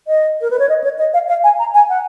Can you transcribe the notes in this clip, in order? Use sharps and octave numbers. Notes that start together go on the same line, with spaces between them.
D#5
A#4
B4
C#5
D#5
C#5
D#5
F5
F5
G#5
A#5
G#5
F#5